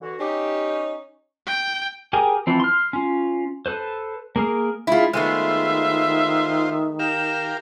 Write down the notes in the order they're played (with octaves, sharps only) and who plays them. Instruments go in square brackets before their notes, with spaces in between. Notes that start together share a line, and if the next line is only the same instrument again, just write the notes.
[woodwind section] D3 E3 F#4
[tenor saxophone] C#4 [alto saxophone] D#4 [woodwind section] G4
[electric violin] G5
[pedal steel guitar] G4 G#4 A#4 G5 G#5
E3 F3 C4
C6 F6
C#4 F4
A4 B4 C5
A#3 G#4 A#4
[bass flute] G#3 [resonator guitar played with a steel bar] E4 F4 [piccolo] B5
[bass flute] D#3 [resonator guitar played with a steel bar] G#3 A3 B3 [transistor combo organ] F4 C5 [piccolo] E5
[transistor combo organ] G4 A#4 F5 [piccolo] E7